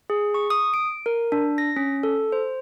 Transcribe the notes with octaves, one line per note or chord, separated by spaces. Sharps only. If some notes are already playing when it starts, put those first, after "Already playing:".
G#4
C#6
D#6
D7
A#4
D4
A#6
C#4
A4
C5